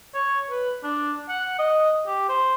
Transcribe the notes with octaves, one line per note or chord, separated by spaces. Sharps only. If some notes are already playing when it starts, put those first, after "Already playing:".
C#5
B4
D4
F#5
D#5
G4
C5